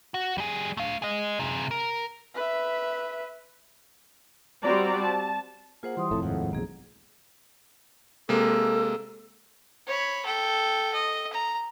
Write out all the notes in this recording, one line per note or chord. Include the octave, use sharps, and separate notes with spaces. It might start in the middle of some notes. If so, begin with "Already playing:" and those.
F#4
G3 G#4
A3 F5
G#4 D#5
C3 G#4
A#4
B4 E5
G3 C4 F#4 C5 D5 A#5
A5
A#3 F4 G#4 C5 F#5
E3 G3 C6 D#6
F1 F2 A2 E4 A4
D#2 G#2 F#5
B1 F2 A#3 G#4
C3 G#3 A#3 A4
C#5 B5
A4 G5
D#5
A#5